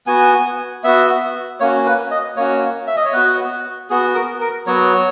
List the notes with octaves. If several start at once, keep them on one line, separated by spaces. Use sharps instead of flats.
B3 F#4 G#5
B3 F#4 E5
A#3 C#4 F#4 C#5
B4
D#5
A#3 C#4 F#4 C#5
E5
D#5
C#5
B3 F#4 B4
B3 F#4 G#4
A#4
A#4
F#3 B3 F#4 C#5